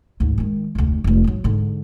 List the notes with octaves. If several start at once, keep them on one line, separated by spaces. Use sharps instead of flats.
D2 G#2
D#3 G#3
F1 D2
F1 A3
G#2 F#3
G#2 D3